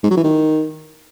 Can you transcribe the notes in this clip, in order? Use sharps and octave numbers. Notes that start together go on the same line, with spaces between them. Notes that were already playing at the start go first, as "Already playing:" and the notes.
G#2
F#3
E3
D#3